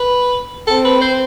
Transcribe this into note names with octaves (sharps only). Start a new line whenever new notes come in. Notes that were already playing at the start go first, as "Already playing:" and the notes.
Already playing: B4
C4 A4
B4
C5